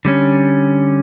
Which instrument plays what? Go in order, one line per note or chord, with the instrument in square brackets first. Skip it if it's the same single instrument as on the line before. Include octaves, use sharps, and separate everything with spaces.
[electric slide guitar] D3 G3 C#4